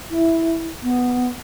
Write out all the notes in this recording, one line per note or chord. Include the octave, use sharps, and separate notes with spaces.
E4
B3